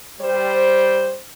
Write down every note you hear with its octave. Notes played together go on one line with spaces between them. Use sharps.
G3 C5